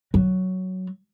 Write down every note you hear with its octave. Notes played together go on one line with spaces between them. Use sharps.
F#3